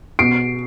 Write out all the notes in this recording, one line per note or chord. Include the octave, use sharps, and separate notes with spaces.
B2 C7 D7